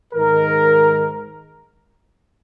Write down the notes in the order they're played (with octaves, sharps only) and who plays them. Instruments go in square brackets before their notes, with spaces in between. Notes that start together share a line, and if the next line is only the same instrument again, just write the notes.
[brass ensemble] G#2 D#3 G#3 A#4